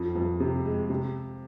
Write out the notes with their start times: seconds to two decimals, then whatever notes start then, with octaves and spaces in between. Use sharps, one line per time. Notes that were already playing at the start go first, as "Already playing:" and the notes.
Already playing: F2
0.16 F2
0.40 C3
0.65 G#3
0.90 C3